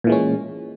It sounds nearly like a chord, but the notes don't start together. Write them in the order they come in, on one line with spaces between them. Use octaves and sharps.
A#2 E3 G#3 C#4